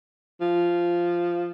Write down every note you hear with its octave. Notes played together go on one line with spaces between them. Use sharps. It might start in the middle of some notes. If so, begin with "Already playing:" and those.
F3